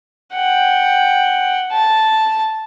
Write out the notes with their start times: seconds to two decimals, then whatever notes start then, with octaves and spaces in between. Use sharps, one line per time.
0.34 F#5 G5
1.73 A5